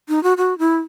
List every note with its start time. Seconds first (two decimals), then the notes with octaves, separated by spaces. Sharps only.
0.09 D#4
0.23 F#4
0.37 F#4
0.59 E4